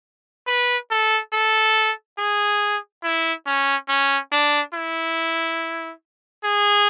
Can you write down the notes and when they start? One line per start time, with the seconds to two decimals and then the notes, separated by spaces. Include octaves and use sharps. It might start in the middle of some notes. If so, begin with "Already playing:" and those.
0.47 B4
0.91 A4
1.33 A4
2.18 G#4
3.03 E4
3.46 C#4
3.88 C#4
4.32 D4
4.73 E4
6.44 G#4